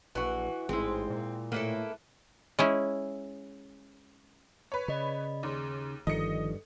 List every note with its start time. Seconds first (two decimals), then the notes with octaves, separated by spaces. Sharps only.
0.15 A#1 E3 F#4
0.69 A1 G#2 G#3 C4 E4
1.10 A#2
1.52 A2 A#3 E4 A4 B4
2.59 G#3 C#4 E4
4.72 B4 C#5
4.88 C#3 D5 D#5 B5
5.43 D#2 G#4 C6 D6
6.07 G1 G2 D#3 F3 A4 D#5 C#7